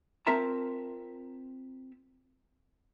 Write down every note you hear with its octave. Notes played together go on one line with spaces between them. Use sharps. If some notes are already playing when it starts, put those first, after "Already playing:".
C4 F4 A#4 E5 A5 A#5